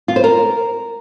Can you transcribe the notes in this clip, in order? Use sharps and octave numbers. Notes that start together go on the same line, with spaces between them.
F4
C5
A#4